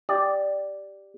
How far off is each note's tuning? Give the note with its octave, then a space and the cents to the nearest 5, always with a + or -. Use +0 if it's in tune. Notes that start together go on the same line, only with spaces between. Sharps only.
G4 +0 D5 +0